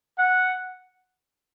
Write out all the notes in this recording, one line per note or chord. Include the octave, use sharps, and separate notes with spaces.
F#5